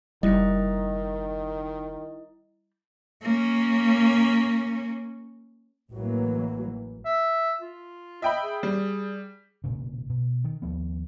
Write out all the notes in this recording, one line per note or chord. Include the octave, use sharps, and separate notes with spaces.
F#1 D#3 G3 E4 D#5
A#3 C#4
A1 E3 F#3 A#3
E5
F4
D#5 E5 G5 B5
G#4
G3
E1 A#2 C#3
B2
D#3
D#2 F3 B3